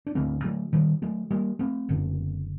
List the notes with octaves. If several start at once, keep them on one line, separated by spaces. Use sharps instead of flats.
D4
D2 D3 A3 C4
F#3 A3
D#3 G3
F#3 A3
G3 A#3
A3 C4
F#1 F#2 D3